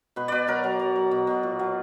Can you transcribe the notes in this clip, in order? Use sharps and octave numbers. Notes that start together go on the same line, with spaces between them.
B2 B4
B2 B4 D5
F#3 A#4
F#3
F#3
F#3
B2
B2
A#2
F#3